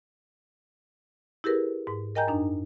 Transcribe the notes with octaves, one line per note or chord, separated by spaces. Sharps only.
E4 G4 G#4 A#4 B4
G#2
A#4 D#5 G5 G#5 A#5 G6
F#2 D4 D#4